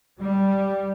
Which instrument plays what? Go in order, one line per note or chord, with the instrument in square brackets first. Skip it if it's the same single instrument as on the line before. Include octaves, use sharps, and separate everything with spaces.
[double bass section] G3